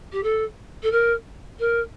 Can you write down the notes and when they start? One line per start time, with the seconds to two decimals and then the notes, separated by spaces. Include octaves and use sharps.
0.12 G4
0.23 A4
0.83 A4
0.91 A#4
1.59 A#4